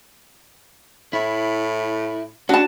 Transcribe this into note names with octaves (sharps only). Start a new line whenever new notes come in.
A2 E4
C#4 D4 F#4 A5